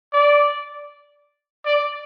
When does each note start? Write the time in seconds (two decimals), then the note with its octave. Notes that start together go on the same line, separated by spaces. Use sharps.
0.13 D5
1.65 D5